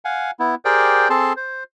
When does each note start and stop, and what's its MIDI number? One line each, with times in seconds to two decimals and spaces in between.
0.05 0.31 77
0.05 0.31 78
0.05 0.31 80
0.39 0.55 59
0.39 0.55 64
0.65 1.08 67
0.65 1.08 68
0.65 1.08 70
0.65 1.08 72
0.65 1.08 74
0.65 1.08 79
1.10 1.33 60
1.10 1.33 68
1.10 1.33 69
1.10 1.33 81
1.10 1.33 84
1.36 1.64 72